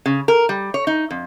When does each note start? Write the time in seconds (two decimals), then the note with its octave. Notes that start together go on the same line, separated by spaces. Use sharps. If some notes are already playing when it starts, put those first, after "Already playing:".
0.06 C#3
0.28 A#4
0.49 G3
0.74 C#5
0.87 D#4
1.11 F2